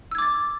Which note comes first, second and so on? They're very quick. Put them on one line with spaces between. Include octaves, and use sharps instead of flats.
E6 G#6 D6 A6